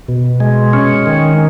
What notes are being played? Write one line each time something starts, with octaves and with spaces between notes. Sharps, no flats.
B2
G#3
C#4
D#3